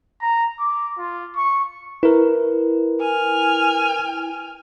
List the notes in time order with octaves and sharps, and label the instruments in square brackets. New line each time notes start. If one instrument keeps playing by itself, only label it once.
[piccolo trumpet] A#5
D6
F4
C#6
[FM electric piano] E4 [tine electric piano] A#4 B4
[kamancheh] G#5 F6